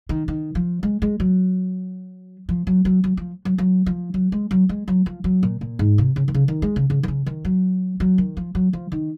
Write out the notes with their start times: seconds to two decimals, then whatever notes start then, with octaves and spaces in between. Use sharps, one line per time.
0.09 D#3
0.28 D#3
0.55 F3
0.83 G#3
1.02 G#3
1.20 F#3
2.49 F3
2.67 F#3
2.85 F#3
3.04 F#3
3.17 F3
3.45 F#3
3.58 F#3
3.86 F3
4.14 F#3
4.32 G#3
4.51 F#3
4.69 G#3
4.88 F#3
5.06 F3
5.24 F#3
5.43 A#2
5.61 A#2
5.79 G#2
5.98 C3
6.16 C#3
6.28 D#3
6.34 C#3
6.48 D#3
6.62 G#3
6.76 C#3
6.90 C#3
7.03 D#3
7.08 C#3
7.26 D#3
7.45 F#3
8.00 F#3
8.18 D#3
8.37 F3
8.55 F#3
8.73 F3
8.92 D#3